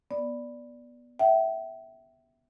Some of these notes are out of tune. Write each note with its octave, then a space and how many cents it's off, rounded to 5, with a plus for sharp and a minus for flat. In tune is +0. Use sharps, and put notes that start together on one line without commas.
B3 -15 D5 +0
E5 +0 G5 -35